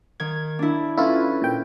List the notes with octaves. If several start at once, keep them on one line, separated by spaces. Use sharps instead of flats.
D#3 G#6
D4 E4
C#4 E4 F4 A4 B4
A#2 G5